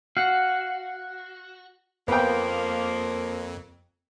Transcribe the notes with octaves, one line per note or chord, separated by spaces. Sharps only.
F#4 F5 F#5
F2 F3 A#3 B3 G5